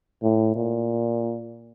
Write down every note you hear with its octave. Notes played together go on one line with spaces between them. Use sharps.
A2
A#2